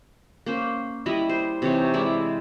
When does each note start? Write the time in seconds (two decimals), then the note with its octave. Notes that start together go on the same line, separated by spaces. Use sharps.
0.46 A#3 C#4 C5
1.06 G3 E4 D#5 E5
1.29 C5
1.62 C3 E3 D#4 C#5
1.94 G#3 E4 D5